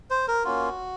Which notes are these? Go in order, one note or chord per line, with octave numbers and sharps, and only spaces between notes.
C5
A#4
A#3 C#4 F4 F#4